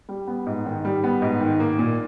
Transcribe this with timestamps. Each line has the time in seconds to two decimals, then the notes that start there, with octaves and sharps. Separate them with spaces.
0.09 G3
0.27 B3
0.46 G#2
0.66 D#3
0.85 G3
1.04 B3
1.22 G#2
1.41 D#3
1.60 A#3
1.79 A#2